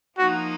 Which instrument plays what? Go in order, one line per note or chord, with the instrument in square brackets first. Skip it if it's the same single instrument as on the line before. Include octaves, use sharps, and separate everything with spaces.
[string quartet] F3 A#3 D#4 [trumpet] F#4